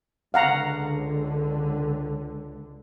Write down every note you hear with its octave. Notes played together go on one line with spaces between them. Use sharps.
C#2 D3 F5 F#5 A#5